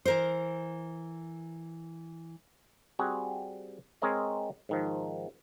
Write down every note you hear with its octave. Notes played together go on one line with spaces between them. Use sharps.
E3 A#4 C5
G3 C4 F#4 G#4
G#3 C4 A#4 C#5 D#5
G#2 D#3 F3